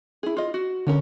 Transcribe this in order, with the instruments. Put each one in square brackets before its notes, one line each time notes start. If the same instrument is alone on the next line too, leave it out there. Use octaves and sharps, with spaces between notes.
[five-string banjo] E4 G#4
F4 D#5
F#4
[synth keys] D3 [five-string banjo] G#3 C#4 A#4